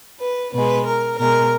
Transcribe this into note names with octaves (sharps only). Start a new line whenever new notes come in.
B4
B2 G#3 B4
A#4
B2 G#3 A#4